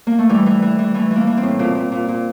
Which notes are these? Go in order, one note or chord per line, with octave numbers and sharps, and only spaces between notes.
A#3
A3
E3 G3
E3
E3
E3
E3 A3
E3 A#3
E3
C4
A2
A#2 C4
A#2
A#2
A#2